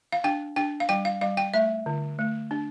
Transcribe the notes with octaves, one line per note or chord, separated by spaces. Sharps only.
F5
D4 G5
D4 G5
F5
G3 G5
F5
G3 F5
G5
A3 E5
D3
A3
D4